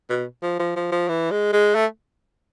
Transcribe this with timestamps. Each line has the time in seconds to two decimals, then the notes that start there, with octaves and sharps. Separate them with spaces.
0.10 B2
0.43 F3
0.59 F3
0.76 F3
0.92 F3
1.09 E3
1.31 G#3
1.53 G#3
1.75 A3